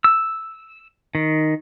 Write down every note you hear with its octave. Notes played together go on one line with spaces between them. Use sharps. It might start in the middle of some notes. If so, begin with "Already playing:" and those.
E6
D#3